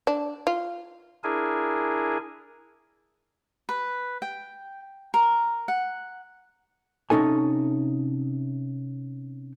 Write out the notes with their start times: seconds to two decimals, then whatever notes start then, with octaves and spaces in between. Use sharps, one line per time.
0.07 D4
0.47 F4
1.24 D4 E4 G#4 A#4 G#5
3.69 B4
4.22 G5
5.14 A#4
5.68 F#5
7.10 C3 C#4 D#4 A4 G#5